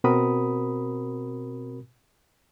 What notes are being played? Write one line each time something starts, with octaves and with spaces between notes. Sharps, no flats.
B2 C4 F#4 A#4 B5 D#6